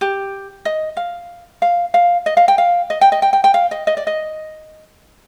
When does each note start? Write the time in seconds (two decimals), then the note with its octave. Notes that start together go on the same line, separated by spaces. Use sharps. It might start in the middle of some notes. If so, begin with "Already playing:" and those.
0.01 G4
0.65 D#5
0.97 F5
1.62 F5
1.94 F5
2.26 D#5
2.37 F5
2.48 G5
2.58 F5
2.90 D#5
3.01 G5
3.12 D#5
3.22 G5
3.33 G5
3.44 G5
3.54 F5
3.71 D#5
3.87 D#5
3.97 D5
4.07 D#5